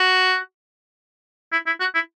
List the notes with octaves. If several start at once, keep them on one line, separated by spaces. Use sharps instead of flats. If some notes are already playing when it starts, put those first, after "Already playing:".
Already playing: F#4
E4
E4
F#4
E4